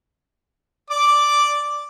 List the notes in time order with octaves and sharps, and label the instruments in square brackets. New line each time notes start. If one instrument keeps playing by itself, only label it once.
[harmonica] D5 D6